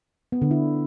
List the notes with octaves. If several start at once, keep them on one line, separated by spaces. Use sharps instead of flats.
B3
D3
E4